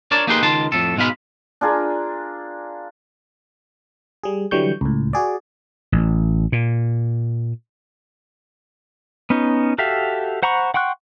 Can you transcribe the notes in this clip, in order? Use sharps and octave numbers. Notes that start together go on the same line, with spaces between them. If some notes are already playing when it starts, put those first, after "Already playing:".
D4 A#4 C#5 D5 A5
A#3 D#4 G4 G#4 B4 C6
C#2 D#3 A5 C6
F2 A2 A4
G#2 B2 G#3 F5 B5
D4 F4 G#4 A#4
G3 G#4
D3 E3 F#3 G3 C#6 G6
C#2 A2
F#4 G#4 D5
A1
A#2
B3 C#4 D#4
F#4 G4 A4 E5 F5
C5 F#5 A#5 B5 C#6
F#5 G5 C6 C#6 F#6